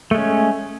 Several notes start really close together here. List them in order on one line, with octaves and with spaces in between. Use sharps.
A3 G#3 C#4